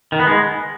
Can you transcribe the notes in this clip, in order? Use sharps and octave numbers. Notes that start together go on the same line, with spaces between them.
D#3
B3
G#3